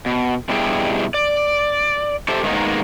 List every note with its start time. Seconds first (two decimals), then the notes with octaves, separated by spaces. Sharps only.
0.06 B2
0.49 B2 G3 D4 E4 G4 G#4
1.14 D5
2.28 G4 A4 C5 E5
2.43 G#2 D#3 G#3 A#3 B3 D#4